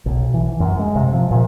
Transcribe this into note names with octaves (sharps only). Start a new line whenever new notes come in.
B1
E3
F#2
G#3
C3
F3
A#2